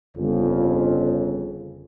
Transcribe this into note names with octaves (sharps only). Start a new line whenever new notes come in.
G1 F2 C#3